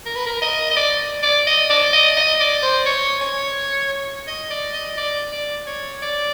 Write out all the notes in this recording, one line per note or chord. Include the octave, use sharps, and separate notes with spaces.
A#4
B4
A#4
D#5
D#5
D5
D5
D#5
D5
D#5
D#5
D5
C5
C#5
C#5
D#5
D5
D#5
D5
D5
C#5
D5